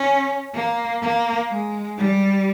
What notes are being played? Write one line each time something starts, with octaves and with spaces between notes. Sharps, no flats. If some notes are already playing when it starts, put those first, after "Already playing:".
Already playing: C#4
A#3
A#3
G#3
G3